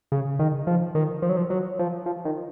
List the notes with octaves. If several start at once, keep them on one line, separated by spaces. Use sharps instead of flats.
C#3
D#3
F3
D#3
F3
F#3
F3
F#3
F3
F3
D#3